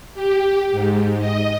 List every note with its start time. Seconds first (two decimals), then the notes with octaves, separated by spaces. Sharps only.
0.14 G4
0.71 G#2
1.19 D#5